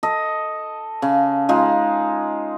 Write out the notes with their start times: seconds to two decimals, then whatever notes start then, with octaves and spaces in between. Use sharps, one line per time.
0.03 A4 D#5
1.02 C#3
1.49 G#3 D#4 F4